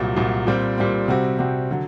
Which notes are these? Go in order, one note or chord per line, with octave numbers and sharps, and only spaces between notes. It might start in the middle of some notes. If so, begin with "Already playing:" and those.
Already playing: C2 A#2 F#3
C2 A#2 F#3
A#2 G3 C4
A#2 G3 C4
C3 G3 C4 F#4
C3 G3 C4 F#4
D3 F#3